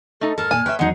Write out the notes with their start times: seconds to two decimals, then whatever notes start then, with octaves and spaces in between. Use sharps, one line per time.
0.21 A3 D#4 A4
0.38 G#2 A4 A#4 F6
0.51 A#2 G#5 A5
0.66 B4 C#5 E5 G5
0.79 E2 F#3 G#3 D#4 F#5